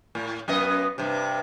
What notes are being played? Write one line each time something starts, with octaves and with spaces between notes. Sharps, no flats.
A2
F#2 B3 D#5
G2 C3